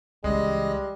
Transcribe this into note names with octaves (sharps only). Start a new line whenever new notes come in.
C#2 E3 G3 G#3 D#5